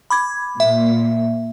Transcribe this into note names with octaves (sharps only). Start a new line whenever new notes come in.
B5 D6 G#6
A#2 E5